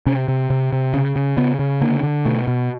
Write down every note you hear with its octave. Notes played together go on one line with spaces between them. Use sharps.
C3 C#4
C3
C3
C3
C#3
C#3
C#3 B3
C#3
D3 A#3
D3
B2 A3
B2